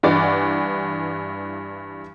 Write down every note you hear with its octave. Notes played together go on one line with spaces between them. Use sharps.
G2 E3 D5 F#5